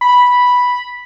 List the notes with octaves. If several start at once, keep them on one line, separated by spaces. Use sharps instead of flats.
B5